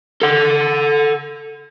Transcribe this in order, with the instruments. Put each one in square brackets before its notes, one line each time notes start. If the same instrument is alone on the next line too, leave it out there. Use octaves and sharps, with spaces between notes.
[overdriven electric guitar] A4 F#5